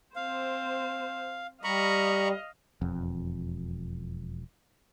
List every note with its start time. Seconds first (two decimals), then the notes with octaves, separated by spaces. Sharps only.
0.16 C4 C5 F5
1.64 G3 D#5 F5 A#5 B5 C#6
2.81 E1 F2